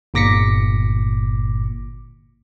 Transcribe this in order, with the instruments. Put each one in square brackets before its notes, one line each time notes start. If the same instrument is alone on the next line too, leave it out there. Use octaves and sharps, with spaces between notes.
[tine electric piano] G1 A#2 D6 A#6 B6 C#7